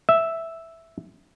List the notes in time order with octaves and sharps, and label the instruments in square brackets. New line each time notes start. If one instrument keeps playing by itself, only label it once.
[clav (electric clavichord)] E5